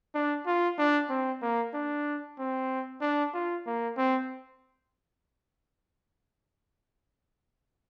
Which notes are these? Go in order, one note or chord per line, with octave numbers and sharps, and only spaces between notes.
D4
F4
D4
C4
A#3
D4
C4
D4
F4
A#3
C4